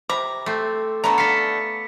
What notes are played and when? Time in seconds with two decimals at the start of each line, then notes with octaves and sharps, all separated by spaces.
0.09 C3 A#5 B5 D6
0.46 A3 C4
1.04 D3 A3 B3 A#5
1.18 A4 F5 B6 C#7